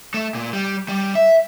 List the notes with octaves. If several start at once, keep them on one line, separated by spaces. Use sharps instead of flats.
A3
A#2
G3
G3
E5